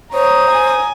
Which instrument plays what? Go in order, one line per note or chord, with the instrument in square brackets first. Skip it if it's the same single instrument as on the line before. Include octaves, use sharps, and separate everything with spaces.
[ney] C5 [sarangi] C#5 [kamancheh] A#5 D#6
[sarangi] G#5